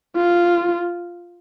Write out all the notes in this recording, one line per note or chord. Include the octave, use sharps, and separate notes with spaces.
F4